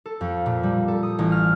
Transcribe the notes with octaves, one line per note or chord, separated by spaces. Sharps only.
A4
F2
A#2
G3
A4
D#6
A1
F6